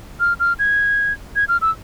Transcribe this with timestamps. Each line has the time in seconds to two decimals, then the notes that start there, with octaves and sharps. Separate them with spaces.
0.20 F6
0.40 F6
0.59 G#6
1.36 G#6
1.48 F6
1.61 E6